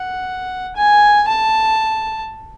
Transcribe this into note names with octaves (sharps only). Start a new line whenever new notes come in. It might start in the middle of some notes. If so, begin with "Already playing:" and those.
Already playing: F#5
G#5
A5